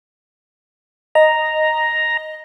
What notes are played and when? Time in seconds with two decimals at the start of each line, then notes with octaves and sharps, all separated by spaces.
1.15 D#5 A#5